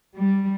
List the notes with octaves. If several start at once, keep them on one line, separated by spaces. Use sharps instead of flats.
G3